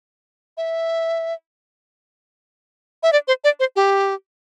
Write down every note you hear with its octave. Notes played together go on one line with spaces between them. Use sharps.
E5
E5
D5
C5
D5
C5
G4